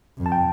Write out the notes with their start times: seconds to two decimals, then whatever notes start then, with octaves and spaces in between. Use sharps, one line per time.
0.18 F2
0.26 A5
0.32 G5